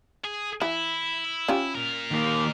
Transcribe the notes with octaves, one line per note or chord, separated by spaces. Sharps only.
G#4
E3 E4
C#4 F4 G4
A#2 A#4
D#3 A#3